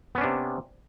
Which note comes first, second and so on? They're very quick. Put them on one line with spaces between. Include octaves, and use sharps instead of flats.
B3 C#4 D4 C3